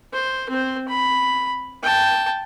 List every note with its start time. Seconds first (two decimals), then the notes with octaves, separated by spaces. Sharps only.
0.13 C5
0.49 C4 C5
0.88 B5
1.83 G5 A5